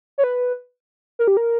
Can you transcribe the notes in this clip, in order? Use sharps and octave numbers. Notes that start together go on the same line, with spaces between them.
C#5
B4
A#4
G4
A#4